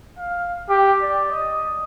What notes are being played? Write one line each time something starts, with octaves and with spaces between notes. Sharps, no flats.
F5
G4
D5
D#5